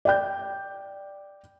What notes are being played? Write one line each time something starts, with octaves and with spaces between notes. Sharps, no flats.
D5 G5 G6